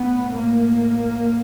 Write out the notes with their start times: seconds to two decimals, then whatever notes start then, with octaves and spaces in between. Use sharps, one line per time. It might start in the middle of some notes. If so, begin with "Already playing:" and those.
Already playing: A2 B3
0.31 A#3